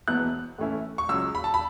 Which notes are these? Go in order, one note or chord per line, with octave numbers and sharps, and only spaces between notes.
E1 E2 B2 B3 E4 F#6
A2 E3 A3 C#4 E4
C#6
C#2 C#3 F#3 E6
B5
A5
B5